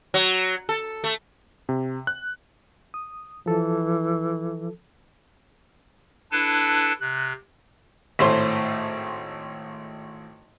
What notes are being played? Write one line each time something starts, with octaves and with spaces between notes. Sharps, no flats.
F#3
A4
A3
C3
F#6
D#6
E3 F3 A4
D4 E4 A4 B4 A5
C3 F#6
G#1 A2 A3 C5 C6